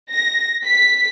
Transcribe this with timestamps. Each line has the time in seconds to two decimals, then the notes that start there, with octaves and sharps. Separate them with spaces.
0.11 A#6
0.65 B6